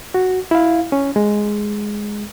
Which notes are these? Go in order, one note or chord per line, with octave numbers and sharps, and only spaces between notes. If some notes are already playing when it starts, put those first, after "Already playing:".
F#4
E4 F5
C#4
G#3